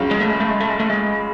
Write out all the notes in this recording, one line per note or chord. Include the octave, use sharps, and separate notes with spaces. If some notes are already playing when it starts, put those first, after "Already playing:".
Already playing: C#2 C#3 F#3
G#3
A3
G#3
A3
G#3
A3
G#3
A3
G#3